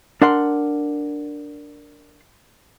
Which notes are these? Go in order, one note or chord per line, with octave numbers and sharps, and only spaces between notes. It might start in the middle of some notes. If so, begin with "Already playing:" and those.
D4 A#4 F#5 C6